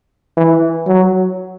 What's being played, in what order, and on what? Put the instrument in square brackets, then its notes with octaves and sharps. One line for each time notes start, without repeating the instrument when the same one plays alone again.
[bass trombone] E3
F#3